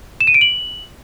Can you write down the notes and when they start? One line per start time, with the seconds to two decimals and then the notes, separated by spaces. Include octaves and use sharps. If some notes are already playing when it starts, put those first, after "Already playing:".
0.20 E7
0.27 D#7
0.34 D7
0.41 F#7